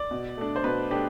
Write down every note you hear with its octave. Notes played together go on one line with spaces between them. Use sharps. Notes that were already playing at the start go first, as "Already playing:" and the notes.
Already playing: D5
B2
A3 D4
C5
B2 B4
A3 D4 G4